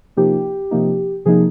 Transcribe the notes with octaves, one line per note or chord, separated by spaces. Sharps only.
C3 F3 A#3 D#4 G4
C3 F3 A#3 D#4
C3 F3 A#3 D#4 G#4